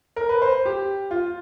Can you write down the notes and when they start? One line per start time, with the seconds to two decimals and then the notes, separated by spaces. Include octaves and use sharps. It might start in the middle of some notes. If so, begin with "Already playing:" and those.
0.16 A#4
0.29 B4
0.42 C5
0.65 G4
1.11 F4